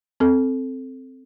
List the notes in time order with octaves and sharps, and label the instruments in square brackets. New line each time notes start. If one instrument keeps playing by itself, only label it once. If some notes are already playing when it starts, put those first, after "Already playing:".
[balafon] C4 A4